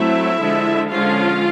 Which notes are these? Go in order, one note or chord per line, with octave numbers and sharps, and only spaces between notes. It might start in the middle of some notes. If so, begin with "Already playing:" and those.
Already playing: F#3 A3 C4 E4 E5
D3 F3 G#3
D3 F3 G#3 C#4 F4 F5